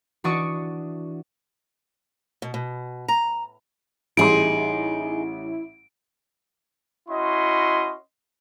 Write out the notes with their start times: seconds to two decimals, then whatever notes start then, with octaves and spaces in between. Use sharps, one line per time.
0.24 E3 D4 F#4 D5 C#6 D#6
2.42 B2
2.54 B2
3.08 A#5
4.17 A1 G3 D#4 E4 G#4 C6 D7
7.09 C#4 E4 F#4 D#5 C6